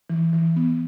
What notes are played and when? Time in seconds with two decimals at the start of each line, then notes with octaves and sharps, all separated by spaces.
0.10 E3
0.33 E3
0.56 B3